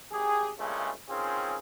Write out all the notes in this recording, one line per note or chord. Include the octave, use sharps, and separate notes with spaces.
G#1 G4 G#4
G2 A#2 C#3 G#3 A3
D#3 C4 C#4 F4 G#4